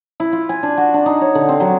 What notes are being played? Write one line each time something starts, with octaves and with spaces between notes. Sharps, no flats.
E4
F4
G#5
D4
F#4
D4
D#4
C#5
D3
C4
F#3